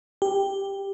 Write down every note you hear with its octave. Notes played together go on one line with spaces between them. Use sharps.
G4